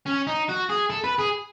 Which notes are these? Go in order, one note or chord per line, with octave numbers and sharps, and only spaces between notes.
C#4
D#4
F#4
G#4
A4
B4
G#4